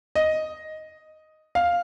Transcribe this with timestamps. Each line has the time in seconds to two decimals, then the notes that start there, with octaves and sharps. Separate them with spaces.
0.15 D#5
1.55 F5